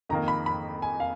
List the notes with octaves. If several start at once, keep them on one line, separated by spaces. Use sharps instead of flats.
F2 D#3 A#3 A#5
B5
B5
G#5
F5